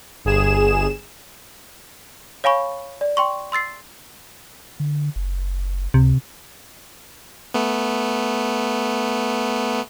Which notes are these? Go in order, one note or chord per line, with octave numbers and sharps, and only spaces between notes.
G1 G#4 E7
C#5 F5 G#5 B5 C#6
D5
G5 C6 C#6
C6 E6 A6 C7
D3
F#1
C#2 C3
A3 B3